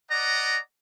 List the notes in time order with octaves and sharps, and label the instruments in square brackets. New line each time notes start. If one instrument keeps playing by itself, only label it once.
[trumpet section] D5 D#5 F#5 A#5